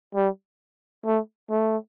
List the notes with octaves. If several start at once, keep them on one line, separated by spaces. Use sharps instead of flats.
G3
A3
A3